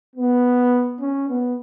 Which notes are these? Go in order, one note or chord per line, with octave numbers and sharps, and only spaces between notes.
B3
C#4
B3